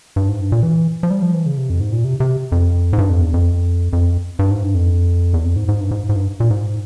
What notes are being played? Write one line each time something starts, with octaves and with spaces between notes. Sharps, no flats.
G2
G#2
G2
A#2
E3
F3
G3
F3
E3
C#3
C3
F2
G#2
A#2
C3
C3
F2
G#2
G2
F2
E2
F2
F2
G2
G#2
G2
F2
E2
F2
G#2
G#2
G2
G#2
G#2
G2
A#2
G#2